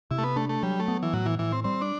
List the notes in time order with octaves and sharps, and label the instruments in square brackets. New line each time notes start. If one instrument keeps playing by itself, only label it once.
[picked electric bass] C3 [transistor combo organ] E4
[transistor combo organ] A3
B3
[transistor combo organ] A3 [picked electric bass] D4
[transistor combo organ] A3
[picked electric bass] F#3 [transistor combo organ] G3
[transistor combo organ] A3
[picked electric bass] B3
[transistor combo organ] E3
[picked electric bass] A2 [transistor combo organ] F#3
[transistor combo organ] E3
[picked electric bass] A2 [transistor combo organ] E3
[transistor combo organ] C4
[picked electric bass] G3 [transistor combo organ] C4
[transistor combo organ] D4